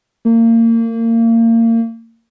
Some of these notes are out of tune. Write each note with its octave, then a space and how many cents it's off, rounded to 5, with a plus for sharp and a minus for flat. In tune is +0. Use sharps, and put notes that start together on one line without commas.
A#3 -30